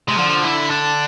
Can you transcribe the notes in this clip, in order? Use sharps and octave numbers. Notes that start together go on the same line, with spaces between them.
C3 G#3
D3 F3
E4
D4